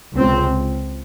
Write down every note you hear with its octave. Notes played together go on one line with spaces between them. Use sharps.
C#2 C3 C4